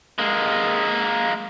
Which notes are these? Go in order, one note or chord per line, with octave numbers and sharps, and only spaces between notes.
G#3 A#3